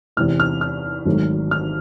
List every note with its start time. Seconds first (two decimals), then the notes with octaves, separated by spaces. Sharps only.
0.17 E2 C3 E3 F6
0.40 F6
0.61 F6
1.06 G#1 G#2 D#3 F#3 A3
1.51 F6